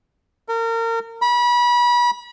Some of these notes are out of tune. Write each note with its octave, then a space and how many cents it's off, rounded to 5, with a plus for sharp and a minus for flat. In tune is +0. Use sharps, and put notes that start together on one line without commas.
A#4 -30
B5 -30